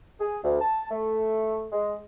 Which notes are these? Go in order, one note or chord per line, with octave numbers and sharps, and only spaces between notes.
G#4
D2
A5
A3
G#3